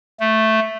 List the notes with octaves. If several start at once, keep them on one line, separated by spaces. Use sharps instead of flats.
A3